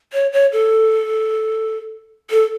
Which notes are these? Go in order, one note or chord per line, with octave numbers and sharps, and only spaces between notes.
C#5
C#5
A4
A4